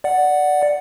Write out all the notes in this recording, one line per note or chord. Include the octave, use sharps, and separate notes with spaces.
D5 F#5